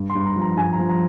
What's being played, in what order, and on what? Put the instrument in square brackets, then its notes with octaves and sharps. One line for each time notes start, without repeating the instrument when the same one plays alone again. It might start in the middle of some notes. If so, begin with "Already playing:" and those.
Already playing: [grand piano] G2
C6
G2
A#5
F3
A#5
G2 G#5
A#5
F3
A#5